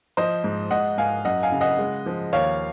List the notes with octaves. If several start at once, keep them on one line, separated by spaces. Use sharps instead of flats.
F3 C5 D#5
G#2
G#2 D#5 F#5
G#2 F5 G#5
F#2 D#5 F#5
F5 G#5
C#3
D#5 F#5
G#3
F3
D#2 C#5 F5